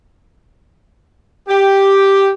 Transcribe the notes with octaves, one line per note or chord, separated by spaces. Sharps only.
G4